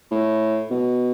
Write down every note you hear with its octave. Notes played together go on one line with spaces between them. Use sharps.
A2
B2